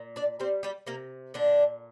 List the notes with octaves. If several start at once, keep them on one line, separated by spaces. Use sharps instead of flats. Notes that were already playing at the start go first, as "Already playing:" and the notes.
Already playing: A#2
D4 D5
G3 C4 C5
G3 G4
C3 A#3 A#4
A#2 D3 D4